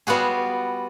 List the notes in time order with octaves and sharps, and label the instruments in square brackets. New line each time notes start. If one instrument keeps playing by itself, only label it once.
[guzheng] G3 B3 F4 F#4 G#4